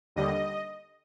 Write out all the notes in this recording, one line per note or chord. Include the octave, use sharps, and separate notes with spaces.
D#2 D3 G3 D#5